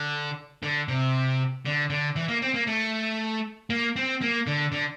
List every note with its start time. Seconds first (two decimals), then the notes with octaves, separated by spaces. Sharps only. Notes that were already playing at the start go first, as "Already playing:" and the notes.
Already playing: D3
0.63 D3
0.88 C3
1.65 D3
1.90 D3
2.16 E3
2.28 A#3
2.42 C4
2.54 A#3
2.67 A3
3.70 A#3
3.96 C4
4.22 A#3
4.47 D3
4.73 D3